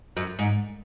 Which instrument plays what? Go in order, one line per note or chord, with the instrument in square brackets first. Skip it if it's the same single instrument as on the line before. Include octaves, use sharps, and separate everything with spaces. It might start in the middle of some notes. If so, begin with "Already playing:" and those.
[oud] F#2
G#2